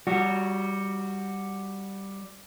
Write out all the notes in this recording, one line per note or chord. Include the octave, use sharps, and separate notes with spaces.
G3 F#4